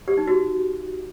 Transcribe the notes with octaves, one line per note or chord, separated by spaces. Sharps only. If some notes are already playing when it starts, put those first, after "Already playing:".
G4
D#4
F#4